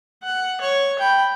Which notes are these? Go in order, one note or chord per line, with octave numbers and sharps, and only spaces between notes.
F#5
C#5
G5 B5